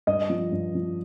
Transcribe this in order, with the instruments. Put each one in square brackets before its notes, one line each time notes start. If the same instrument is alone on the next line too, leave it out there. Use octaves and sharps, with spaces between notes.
[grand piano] G2 D#5
F3
G2
F3